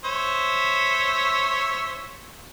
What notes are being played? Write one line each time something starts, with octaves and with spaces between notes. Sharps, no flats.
C5 C#5 E5